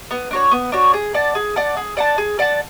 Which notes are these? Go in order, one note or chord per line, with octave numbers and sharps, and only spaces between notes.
B3
D4 F#4 C#5
B3
D4 F#4 C#5
G#4
D5 F#5 A5
G#4
D5 F#5 A5
G#4
D5 F#5 A5
G#4
D5 F#5 A5